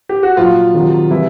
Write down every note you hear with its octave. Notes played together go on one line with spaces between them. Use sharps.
G4
F#4
A#2 F3 F#3 F4
C3 D#3 F#3
C3 E3 G3 E4